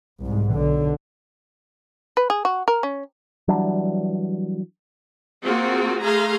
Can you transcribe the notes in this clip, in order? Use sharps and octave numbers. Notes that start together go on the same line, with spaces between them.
C2 G#2
B1 D3
B4
G#4
F#4
A#4
C#4
E3 F#3 G3 D4
A#3 C4 F4 F#4 G#4
A3 G#4 F5 A#5 C6